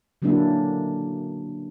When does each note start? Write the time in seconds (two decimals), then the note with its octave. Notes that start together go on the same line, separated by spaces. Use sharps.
0.22 D3 F#3 A#3 C#4 D4 E4